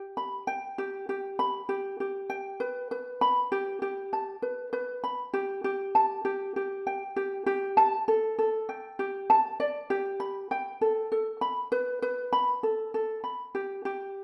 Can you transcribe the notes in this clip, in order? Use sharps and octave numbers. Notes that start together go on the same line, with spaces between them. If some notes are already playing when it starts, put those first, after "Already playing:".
Already playing: G4
B5
G5
G4
G4
B5
G4
G4
G5
B4
B4
B5
G4
G4
A5
B4
B4
B5
G4
G4
A5
G4
G4
G5
G4
G4
A5
A4
A4
G5
G4
A5
D5
G4
B5
G5
A4
A4
B5
B4
B4
B5
A4
A4
B5
G4
G4